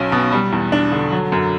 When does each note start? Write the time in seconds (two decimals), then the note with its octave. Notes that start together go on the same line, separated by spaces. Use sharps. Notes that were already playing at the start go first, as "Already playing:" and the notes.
Already playing: B1 F#3 C#4
0.12 B2
0.32 G3
0.52 E2
0.72 D4
0.92 D3
1.12 F#3
1.32 F#2